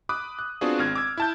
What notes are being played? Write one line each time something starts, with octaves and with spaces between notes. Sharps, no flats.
B5 D6 D#6 F#6
F#6
B3 C4 D4 F4 F#4 G#4
G#1 C4 F6 G#6
D6 E6 G#6
E4 A5 G6